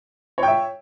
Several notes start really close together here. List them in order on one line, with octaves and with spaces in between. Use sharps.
C#5 G5 E5